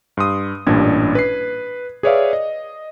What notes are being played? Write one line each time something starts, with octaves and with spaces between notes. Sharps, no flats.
G2 C6 D#6
A1 G2 A#2 D4 G#6
B4 C7
G#4 B4 C#5 D5 E5 F5
D#5